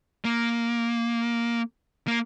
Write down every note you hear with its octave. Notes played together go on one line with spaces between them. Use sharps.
A#3
A#3